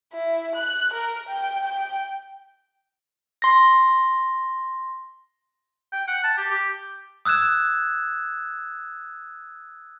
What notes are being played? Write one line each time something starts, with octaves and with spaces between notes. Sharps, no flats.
E4
F#6
A#4
G5
G5
C6 A#6
G5
F#5
A5
G4
G4
D#6 E6 F#6 G#6 E7